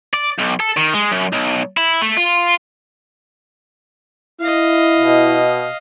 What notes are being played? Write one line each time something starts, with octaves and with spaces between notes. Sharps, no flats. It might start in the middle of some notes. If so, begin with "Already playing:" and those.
D5
B1
A4
D#3
G#3
F#2
B1
E4
A3
F4
E4 D#5 F5
B2